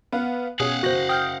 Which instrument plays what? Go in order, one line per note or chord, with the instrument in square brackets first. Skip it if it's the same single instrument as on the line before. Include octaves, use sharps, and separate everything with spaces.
[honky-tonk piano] B3 [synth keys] B4 F5 F#5
[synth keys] B2 [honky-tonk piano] C#4 G#4 [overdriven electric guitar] F5 F#5 [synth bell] D#6
[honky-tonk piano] F#1 A#6 F#7 [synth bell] F#4 C5
[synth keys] G5 [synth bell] D#6 F6 G6